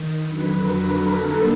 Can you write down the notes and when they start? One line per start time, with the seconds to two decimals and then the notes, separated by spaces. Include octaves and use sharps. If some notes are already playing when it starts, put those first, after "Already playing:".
Already playing: D#3
0.23 F2 D3 F#3 B4
0.55 A#4
0.87 A4
1.18 D3 G3 A#3 D#4